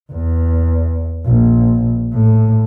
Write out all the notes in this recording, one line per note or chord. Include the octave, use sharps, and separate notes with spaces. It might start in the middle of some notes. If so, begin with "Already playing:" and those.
E2
A#1
A2